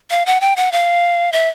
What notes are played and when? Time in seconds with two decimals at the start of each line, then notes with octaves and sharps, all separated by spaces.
0.11 F5
0.26 F#5
0.41 G5
0.56 F#5
0.72 F5
1.32 E5